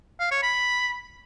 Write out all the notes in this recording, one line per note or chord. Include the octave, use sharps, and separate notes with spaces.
F5
C#5
B5